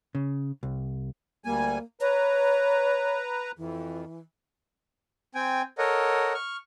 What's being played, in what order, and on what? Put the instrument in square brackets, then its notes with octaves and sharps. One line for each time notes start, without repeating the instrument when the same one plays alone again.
[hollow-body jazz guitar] C#3
C2
[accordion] D2 G3 G#5 [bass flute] A#3
[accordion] B4 A#5 [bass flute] C#5
[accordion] F2 [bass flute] E3
[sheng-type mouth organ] C4 G5 G#5
A4 A#4 C#5 D#5 F#5
C#6 F6